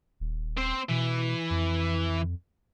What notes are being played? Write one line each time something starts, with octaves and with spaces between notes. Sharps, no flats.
D#1
C4 C5
B2 E3
F2